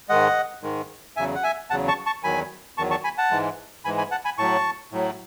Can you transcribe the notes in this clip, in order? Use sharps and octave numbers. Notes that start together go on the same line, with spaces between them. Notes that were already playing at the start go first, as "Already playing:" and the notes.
G#2 D#3 G#3 D#5 F#5
G#2 D#3 G#3
E2 C#3 F#3 E5 G#5
F#5
E5 G#5
E2 C#3 F#3 F#5 A5
A5 C#6
A5 C#6
E2 D#3 F#3 G#5 B5
E2 D#3 F#3 A5 C#6
A5 C#6
G#5 B5
F#5 A5
G#2 E3 G#3
G#2 E3 G#3 G#5 B5
G#5 B5
F#5 A5
G#5 B5
A2 F#3 A5 C#6
A2 F#3